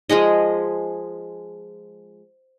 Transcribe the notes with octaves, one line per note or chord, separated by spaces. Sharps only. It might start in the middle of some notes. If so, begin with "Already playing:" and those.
F3 G#3 G#4 D#5